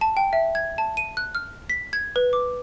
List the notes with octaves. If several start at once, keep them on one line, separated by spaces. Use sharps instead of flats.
A5
G5
E5
G#6
A5
D#7
F#6
F6
B6
G#6
B4
D6